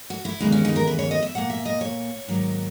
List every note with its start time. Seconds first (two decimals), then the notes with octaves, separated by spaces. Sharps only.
0.10 F#4
0.25 E4
0.40 D#2 C#3 E3 G#3 B3 D#4
0.52 C#4
0.65 D#4
0.76 A#4
0.87 B4
0.99 C#5
1.11 D#5
1.23 E5
1.35 A#2 A#3 F#5
1.50 E5
1.65 D#5
1.81 C#5
2.27 G#2 D#3 F#3 A#3